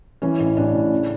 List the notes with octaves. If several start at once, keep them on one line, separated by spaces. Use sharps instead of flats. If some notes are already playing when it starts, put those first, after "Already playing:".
E3 C#4
A1
A1 D4
A2
C#3